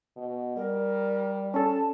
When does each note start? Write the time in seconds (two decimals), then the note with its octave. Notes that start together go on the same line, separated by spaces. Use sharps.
0.16 B2
0.56 G3 A#4
1.54 C#4 A4 A5